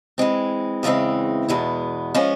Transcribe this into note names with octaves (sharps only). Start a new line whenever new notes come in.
E3 G#3 C4
E2 C#3 E3 G#3 C4
E2 B2 G#3 B3
F3 G#3 C#4 F4